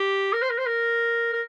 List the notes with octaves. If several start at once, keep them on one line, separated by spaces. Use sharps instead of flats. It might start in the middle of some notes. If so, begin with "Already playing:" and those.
Already playing: G4
A#4
C5
A#4
C5
A#4
A#4